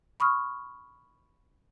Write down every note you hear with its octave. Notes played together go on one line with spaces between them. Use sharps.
B5 C#6 D#6 F6